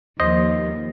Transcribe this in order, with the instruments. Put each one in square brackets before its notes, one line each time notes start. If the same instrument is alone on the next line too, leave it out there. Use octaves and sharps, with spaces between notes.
[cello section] D#2 F3 [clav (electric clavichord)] C5 D#5